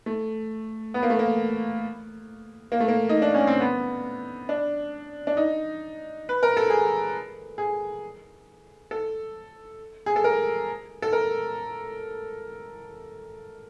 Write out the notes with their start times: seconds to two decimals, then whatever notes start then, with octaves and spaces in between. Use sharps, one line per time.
0.06 A3
0.94 B3
1.03 A#3
1.10 A3
1.19 A#3
2.72 A#3
2.80 A3
2.88 A#3
3.09 D#4
3.22 D4
3.34 C#4
3.47 C4
3.60 B3
4.49 D4
5.27 D4
5.37 D#4
6.29 B4
6.43 A#4
6.57 A4
6.70 G#4
7.58 G#4
8.91 A4
10.06 G#4
10.16 A4
10.24 A#4
11.02 A4
11.13 A#4